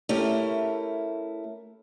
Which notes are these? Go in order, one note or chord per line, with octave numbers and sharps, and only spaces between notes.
A3 C#4 E4 G4 A#4